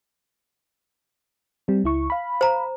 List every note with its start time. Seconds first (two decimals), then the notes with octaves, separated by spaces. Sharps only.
1.68 G3 C4
1.84 C#2 E4 C#6
2.10 F5 B5
2.41 C5 A#5